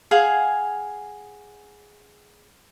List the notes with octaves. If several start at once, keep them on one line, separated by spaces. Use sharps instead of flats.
G#4 F5 F#5 G#5